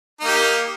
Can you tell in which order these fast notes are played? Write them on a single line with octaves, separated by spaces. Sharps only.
D#4 A#3 G4